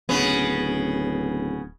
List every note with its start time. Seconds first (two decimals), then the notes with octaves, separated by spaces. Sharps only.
0.09 D1 C#3 B3